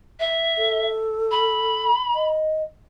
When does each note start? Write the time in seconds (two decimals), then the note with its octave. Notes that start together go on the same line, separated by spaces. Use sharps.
0.19 E5
0.58 A4
1.31 B5
2.15 D#5